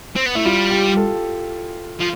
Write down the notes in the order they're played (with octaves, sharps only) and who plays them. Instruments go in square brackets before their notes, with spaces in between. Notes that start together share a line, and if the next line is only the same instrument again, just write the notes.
[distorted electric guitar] C4
B3
[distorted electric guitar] A3 [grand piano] E4
[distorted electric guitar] G3 [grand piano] F4
[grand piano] G4
A4
[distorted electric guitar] F3